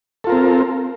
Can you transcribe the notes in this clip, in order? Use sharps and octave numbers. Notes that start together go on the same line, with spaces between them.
C4 F4 A4 A#4